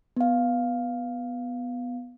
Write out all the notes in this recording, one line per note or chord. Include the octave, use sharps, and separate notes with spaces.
B3 F5